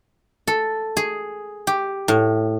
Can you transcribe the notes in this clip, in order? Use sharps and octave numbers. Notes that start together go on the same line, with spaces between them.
A4
G#4
G4
A2